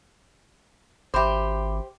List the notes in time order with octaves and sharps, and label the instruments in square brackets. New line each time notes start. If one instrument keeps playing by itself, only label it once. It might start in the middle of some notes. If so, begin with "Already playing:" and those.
[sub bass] G#1 [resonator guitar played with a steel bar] G4 C5 [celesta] E5 B5 D6